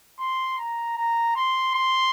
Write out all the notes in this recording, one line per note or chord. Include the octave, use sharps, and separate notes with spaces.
C6
A#5
A#5
C6
C6